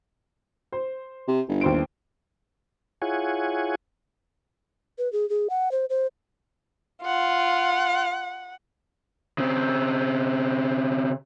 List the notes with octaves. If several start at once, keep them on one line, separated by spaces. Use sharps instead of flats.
C5
C3
G1
D#2 C5 D7
E4 F4 G#4 C#5 F#5 G#5
B4
G#4
G#4
F#5
C5
C5
F4 F#5
C#3 C4